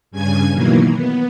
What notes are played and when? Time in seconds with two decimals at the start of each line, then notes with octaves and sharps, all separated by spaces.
0.11 G2 C#3 G#5 G#6
0.51 B2 D#3 E3 F#3 A#3
0.91 B3